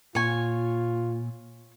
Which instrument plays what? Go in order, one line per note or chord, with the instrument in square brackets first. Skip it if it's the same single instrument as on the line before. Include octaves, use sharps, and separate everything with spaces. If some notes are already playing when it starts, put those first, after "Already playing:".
[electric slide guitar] A#2 [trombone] F4 [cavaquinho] C#5 G#5